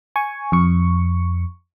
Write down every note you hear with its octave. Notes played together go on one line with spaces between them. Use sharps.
G#5 C#6
F2 C#6